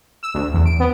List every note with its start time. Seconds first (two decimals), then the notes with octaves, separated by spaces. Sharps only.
0.23 E6
0.34 D2
0.54 E2
0.66 D7
0.80 B3